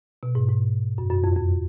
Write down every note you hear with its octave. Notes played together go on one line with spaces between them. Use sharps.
B2
G#2
G#2
F#2
F#2
F2
F2